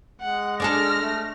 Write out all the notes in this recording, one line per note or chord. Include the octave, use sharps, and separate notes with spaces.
G#3 F#5
D4 G#4 A4 F6 A#6
A3